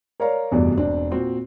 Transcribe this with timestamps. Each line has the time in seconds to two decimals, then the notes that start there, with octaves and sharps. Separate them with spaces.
0.20 A#4 C#5 D5 F5 A#5
0.51 F1 E2 G2 B2 G#4 D5
0.77 E1 C4 D4
1.11 A#2 C4 F#4